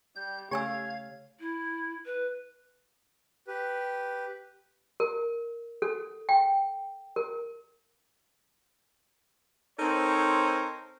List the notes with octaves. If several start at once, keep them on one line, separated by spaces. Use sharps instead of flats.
G3 G6
C#3 A3 G4 C#5 F5 G#5 E6 G#6
E4
B4
G4 B4
A#4
A4
G5
A#4
C4 D#4 A4 A#4 C5 C#5